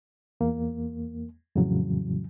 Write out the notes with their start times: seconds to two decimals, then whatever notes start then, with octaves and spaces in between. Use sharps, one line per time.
0.41 E2 A#3
1.56 F2 A2 C#3 E3 F#3